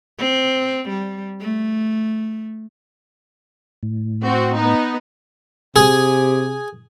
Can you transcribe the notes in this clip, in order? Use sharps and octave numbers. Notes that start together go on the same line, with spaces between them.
C4
G3
A3
A2
C4 F#4
B3 D#4
C3 G#4